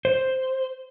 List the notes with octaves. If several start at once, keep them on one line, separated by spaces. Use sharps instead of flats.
C5